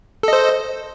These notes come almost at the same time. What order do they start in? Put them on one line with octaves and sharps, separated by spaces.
A4 D#5 C5